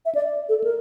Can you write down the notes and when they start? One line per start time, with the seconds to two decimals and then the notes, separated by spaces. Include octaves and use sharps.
0.06 E5
0.15 D5
0.49 A4
0.64 A#4